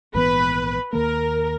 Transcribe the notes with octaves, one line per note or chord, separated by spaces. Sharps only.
A#1 G#2 E3 B3 B4
D#2 D#3 A#3 A#4